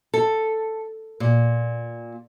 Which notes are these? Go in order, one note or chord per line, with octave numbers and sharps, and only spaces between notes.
A4
A#2